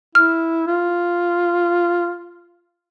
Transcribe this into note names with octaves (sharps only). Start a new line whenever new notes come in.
E4 F6
F4